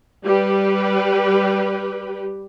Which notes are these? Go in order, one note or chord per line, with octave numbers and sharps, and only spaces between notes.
G3 G4 B4